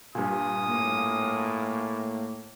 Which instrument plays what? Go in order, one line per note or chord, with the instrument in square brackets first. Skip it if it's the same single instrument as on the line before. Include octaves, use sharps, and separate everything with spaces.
[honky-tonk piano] G2 A#2 [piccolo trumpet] D#6
[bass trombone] A2 [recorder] A#3